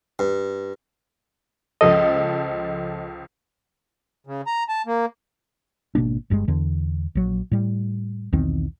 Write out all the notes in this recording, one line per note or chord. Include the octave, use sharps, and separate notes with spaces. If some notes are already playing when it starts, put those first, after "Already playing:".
G2
C#2 F3 A4 D#5
C#3
A#5
A5
A#3
G#1 B2 A#3 D4
G1 G2 C#3 G#3
E2 D3
A#1 F#3
A2 G3
B1 E2 D#3 C4